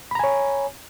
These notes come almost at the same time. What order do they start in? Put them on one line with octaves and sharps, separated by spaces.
B5 A#5 G#5 C#5